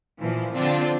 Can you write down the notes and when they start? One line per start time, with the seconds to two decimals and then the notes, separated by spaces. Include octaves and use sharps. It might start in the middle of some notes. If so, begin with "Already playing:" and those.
0.20 A#2 E3 F3
0.55 D3 F3 C4 D4 F4